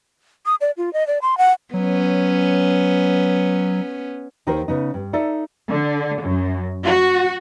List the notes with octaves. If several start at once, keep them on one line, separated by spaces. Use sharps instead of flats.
D#6
D5
F4
D#5
D5
C6
F#5
F#3 B3 C#4
D#2 D#3 D#4 A#4 C5
C#3 B3 D#4
G2
D#4 A4 D5 E5
D3
F#2
F#4